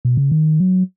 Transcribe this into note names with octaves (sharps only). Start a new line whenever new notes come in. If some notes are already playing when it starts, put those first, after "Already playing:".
B2
C#3
D#3
F#3